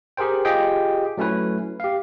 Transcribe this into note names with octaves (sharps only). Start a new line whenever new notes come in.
G4 G#4 A#4 C5 G5
F4 G4 G#4 D#5 G5
F#3 A3 C#4 E4 B4
G4 F5